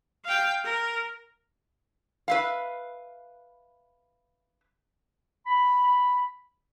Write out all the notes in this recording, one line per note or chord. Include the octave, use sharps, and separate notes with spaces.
F5 G5
A#4
B4 E5 F5
B5